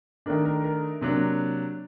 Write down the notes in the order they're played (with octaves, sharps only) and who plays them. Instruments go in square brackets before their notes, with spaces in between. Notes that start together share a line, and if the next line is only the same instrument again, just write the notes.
[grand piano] D#3 A3 D4 A#4
A#4
A#4
C3 F#3 A#3 D4